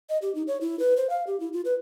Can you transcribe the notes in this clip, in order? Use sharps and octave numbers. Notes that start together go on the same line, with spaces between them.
D#5
G4
D#4
C#5
E4
B4
C5
F5
G4
E4
F4
B4